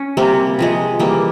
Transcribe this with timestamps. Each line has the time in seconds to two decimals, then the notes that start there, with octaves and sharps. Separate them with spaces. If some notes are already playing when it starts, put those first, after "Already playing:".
Already playing: C#4
0.17 C3 G3 A#3
0.59 C3 F3 G#3
0.99 E3 G3 A#3